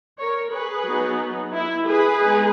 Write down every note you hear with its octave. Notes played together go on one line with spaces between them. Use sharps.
A#4 C#5
G#4 B4
F#3 B3 D#4
E4
G#4 B4
G#3 B3 D#4